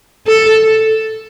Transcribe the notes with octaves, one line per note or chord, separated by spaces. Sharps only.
A4